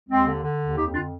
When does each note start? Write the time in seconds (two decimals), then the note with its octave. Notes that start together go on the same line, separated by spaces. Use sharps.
0.09 D#2 G#3 C4
0.26 D3
0.43 D3
0.61 D#2
0.77 F2 D#4 G4
0.94 D3 D4 F4